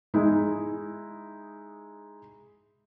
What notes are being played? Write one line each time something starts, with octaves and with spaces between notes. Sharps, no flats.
G#3 D#4 E4